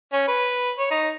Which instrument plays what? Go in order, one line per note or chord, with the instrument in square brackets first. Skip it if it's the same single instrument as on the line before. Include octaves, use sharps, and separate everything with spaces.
[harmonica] C#4
B4
C#5
D#4